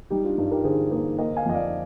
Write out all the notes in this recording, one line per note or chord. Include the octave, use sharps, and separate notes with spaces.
G3 D#4 G4
D4 F4
G2 D#4
G4 A#4
D3 G#4 C5
A#3 G#4 C5
A#3 C5 D#5
F5 G#5
F2 D#5
D5 F5